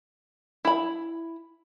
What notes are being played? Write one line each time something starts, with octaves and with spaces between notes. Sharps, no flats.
E4 B5